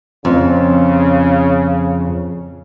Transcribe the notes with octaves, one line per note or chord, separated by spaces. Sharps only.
F2 C#3